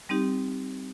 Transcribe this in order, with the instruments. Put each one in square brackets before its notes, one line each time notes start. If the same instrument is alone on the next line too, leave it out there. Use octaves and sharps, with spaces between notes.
[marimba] G3 C4 D#4 G4